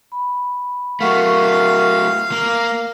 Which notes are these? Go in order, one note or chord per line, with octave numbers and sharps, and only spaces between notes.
B5
F#3 A3 A#4 F5 F#5 C#6
A#3 A#5